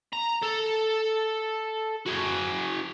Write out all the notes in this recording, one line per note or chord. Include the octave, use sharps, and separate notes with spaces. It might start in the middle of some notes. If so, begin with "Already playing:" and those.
A#5
A4
F#4 G#4